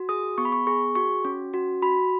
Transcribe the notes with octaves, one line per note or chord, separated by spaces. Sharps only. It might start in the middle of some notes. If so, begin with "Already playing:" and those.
Already playing: F#4
G#4 D#6
B3 C#6
B5
C#6
G#4 C#6
F#4 C#6
C#4
F#4
F#4 B5